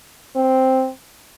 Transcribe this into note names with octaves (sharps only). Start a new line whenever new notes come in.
C4